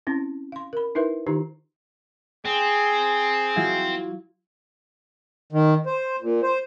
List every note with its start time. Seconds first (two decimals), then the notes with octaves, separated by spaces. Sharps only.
0.07 C4 C#4 E4
0.52 F5 C6
0.73 A#4 B5
0.95 D#4 E4 A#4 B4 E5
1.26 D#3 D#4 F4 G4 C5 A#5
2.45 C4 G#4
3.56 F#3 E4 F4
5.52 D#3
5.86 C5
6.22 A#2
6.43 C5